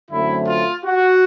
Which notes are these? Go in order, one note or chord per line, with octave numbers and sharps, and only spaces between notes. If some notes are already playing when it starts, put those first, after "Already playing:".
F#2 D3 F#3 A3 C4 E4
F4
F#4